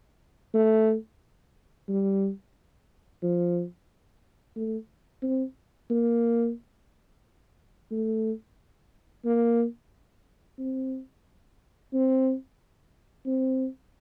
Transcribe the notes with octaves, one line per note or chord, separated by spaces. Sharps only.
A3
G3
F3
A3
C4
A#3
A3
A#3
C4
C4
C4